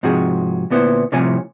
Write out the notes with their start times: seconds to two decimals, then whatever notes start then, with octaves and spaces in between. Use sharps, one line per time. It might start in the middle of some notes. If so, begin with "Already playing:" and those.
0.03 G#2 C3 F3 F#4 G#4
0.70 D2 A#2 B3 E4 C5
1.12 C2 A2 C3 F3 C#5 G#5